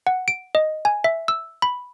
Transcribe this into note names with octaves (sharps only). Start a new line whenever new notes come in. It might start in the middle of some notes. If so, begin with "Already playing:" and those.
F#5
D7
D#5
G#5
E5
E6
B5